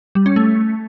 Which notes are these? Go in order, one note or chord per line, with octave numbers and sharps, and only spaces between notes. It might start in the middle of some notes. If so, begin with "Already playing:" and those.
G3
C#4
A3